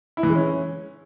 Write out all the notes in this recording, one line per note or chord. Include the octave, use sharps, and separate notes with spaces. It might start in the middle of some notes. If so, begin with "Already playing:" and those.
E4
E3
G#3
C#4